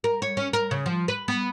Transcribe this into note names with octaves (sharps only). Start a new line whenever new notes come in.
A#4
C#5
C#4
A#4
C#3
F3
B4
B3